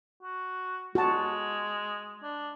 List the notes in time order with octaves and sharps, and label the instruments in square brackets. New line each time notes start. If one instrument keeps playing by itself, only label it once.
[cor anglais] F#4
[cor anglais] G#3 [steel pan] F#4 A5
[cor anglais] D4